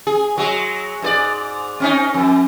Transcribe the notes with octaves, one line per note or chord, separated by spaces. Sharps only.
G#4
F#3 G#3
G#2 G#4 D5
C4 C#4 D#4
F2